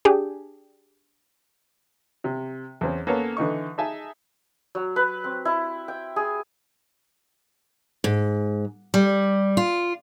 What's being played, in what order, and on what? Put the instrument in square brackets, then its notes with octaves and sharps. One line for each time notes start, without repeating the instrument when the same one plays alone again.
[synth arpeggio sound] D4 G4 G#4
[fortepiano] C3
E2 C4 C#4
A#3 B3 C#4 A4 C#5
D3 E3 D#4 C#6
D#4 G#4 D#5 E5 G#5 A5
[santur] F#3
B4
C4
E4
G5
G#4
[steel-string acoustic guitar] G#2
G3
F4